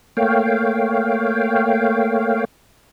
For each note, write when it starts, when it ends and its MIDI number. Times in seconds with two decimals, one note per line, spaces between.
0.17 2.45 57
0.17 2.45 58
0.17 2.45 73
0.17 2.45 77
0.17 2.45 79